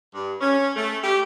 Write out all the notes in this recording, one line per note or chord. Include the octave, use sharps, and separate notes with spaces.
G2
C#4
A3
G4